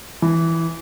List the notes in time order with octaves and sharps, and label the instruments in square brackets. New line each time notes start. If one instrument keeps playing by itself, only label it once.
[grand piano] E3